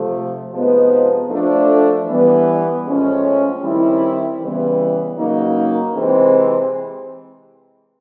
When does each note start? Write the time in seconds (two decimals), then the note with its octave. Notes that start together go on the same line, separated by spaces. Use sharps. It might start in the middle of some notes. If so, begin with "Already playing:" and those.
Already playing: C3 F3 A3
0.51 C3 F3 G#3 B3 D#4
1.29 F3 A3 D4
2.06 E3 G3 B3
2.84 A2 F3 G#3 C#4
3.61 D#3 G3 C4 E4
4.39 C#3 E3 G3 B3
5.17 C#3 F#3 A#3 D#4
5.94 C3 E3 G#3 C4